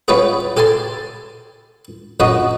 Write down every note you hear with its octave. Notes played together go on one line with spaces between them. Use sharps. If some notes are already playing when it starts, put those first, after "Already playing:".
G3 B3 C#4 F4 G4 G#4
G4 A4 G#5 A5 C6
A#1 F#2 F#4 D#5 D#6